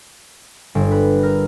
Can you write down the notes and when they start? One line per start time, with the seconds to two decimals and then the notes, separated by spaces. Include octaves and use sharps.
0.75 G1
0.91 B4
1.23 A#4